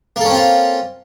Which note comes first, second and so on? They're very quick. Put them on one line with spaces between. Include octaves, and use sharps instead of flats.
A#3 A4 C#4 C4 F4